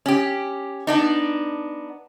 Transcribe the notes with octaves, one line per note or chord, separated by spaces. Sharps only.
C#4 G4
B3 D4 D#4